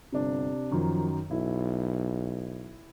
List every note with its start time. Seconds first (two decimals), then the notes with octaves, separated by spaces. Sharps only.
0.12 G1 C3 D4
0.71 F#2 D#3 F3
1.31 B1 E4